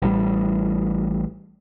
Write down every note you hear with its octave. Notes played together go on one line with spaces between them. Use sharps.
A1 A2 G3